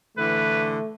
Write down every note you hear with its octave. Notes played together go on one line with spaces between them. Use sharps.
A2 D3 E3 A3 B4